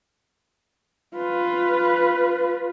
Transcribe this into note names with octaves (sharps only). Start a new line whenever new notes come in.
F4 B4